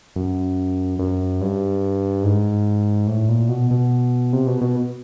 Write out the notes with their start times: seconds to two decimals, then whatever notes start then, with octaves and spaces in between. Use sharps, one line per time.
0.16 F#2
0.99 F#2
1.41 G2
2.23 G#2
3.07 A2
3.29 A#2
3.49 B2
3.71 B2
4.33 C3
4.47 B2
4.61 B2